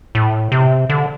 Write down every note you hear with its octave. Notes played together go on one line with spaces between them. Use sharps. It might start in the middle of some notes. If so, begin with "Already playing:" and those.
A2
C3
D3